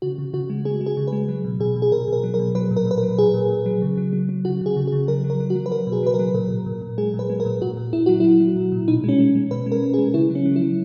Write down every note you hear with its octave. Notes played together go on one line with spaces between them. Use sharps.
C#3 F#4
C#3
C#3 F#4
G#3
G#3 G#4
G#3
G#4
C#3
B4
G#3
F#3
B2
B2 G#4
B2
G#4
B2 A#4
B2
A#4
F#3
A#4
B2
F#3 B4
A#2
A#4
A#2 B4
A#4
F#3
A#2 G#4
A#2
A#2
F#3
C#3
F#3
F#3
F#3
C#3 F#4
C#3 G#4
C#3
G#4
C#3
F#3 A#4
F#3
A#4
F#3
F#4
F#3
B4
F#3 A#4
B2
G#4
F#3 B4
A#4
F#3
A#2 A#4
A#2
A#2
A#2
G#3 G#4
A#2
B4
G#3
A#4
A#2
A#2 F#4
A#2
A#2 E4
F#3 F#4
F#3 E4
F#3
A#2
A#2
B2 D#4
G#3 C#4
G#3
G#3
B2 B4
G#3
A#4
G#3
G#4
G#3
C#3 E4
F#3
C#4
F#3
E4
F#3